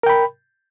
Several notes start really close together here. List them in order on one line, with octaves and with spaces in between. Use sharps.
A#4 G5 B5